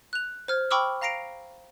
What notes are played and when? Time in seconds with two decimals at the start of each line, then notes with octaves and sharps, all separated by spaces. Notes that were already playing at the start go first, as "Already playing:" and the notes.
0.13 F#6 F7
0.48 C5 F6 G#6
0.71 G5 B5 C#6 D6 E6 F6
1.02 F5 A#5 A#6 C7 D7 F7